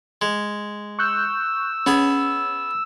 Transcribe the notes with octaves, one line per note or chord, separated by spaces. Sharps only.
G#3
C#6 E6 F#6 G6
B3 C#4 G#4 D#6